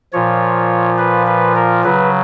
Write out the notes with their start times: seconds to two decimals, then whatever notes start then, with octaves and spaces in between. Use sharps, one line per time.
0.13 A#2 F3 C#5
0.98 B4
1.27 B4
1.56 A#4
1.84 C#3 F#3 B4